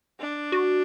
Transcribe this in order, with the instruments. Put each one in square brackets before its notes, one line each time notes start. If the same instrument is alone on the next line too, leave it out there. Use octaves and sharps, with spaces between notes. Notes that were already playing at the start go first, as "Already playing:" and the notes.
[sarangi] D4
[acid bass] F#4